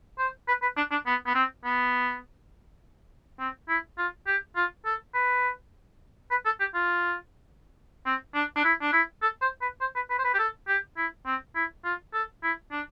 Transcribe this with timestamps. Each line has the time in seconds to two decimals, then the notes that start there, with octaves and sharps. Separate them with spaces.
0.18 C5
0.48 B4
0.62 B4
0.77 D4
0.91 D4
1.06 B3
1.26 B3
1.35 C4
1.64 B3
3.39 C4
3.69 E4
3.98 F4
4.27 G4
4.56 F4
4.86 A4
5.14 B4
6.31 B4
6.45 A4
6.60 G4
6.74 F4
8.06 C4
8.35 D4
8.56 D4
8.64 E4
8.82 D4
8.93 E4
9.22 A4
9.41 C5
9.61 B4
9.81 C5
9.95 B4
10.10 B4
10.19 C5
10.24 B4
10.34 G4
10.39 A4
10.68 G4
10.97 E4
11.26 C4
11.56 E4
11.85 F4
12.13 A4
12.43 E4
12.72 D4